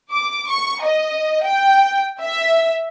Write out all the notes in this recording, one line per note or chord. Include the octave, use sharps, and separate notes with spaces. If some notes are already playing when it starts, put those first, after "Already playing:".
D6
C#6
D#5
G5
E5